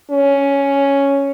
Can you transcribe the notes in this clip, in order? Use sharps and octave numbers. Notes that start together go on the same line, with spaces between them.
C#4